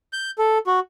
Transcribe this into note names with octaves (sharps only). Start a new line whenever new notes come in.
G6
A4
F#4